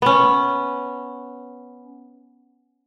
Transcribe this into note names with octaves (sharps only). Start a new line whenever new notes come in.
B3 C#4